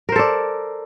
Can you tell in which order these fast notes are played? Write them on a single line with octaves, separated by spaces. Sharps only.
A#4 C5 A4 D5